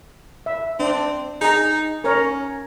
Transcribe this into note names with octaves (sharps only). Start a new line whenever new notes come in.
E5
C4 D4
D#4 G#4 A#5
C#4 A#4 C#5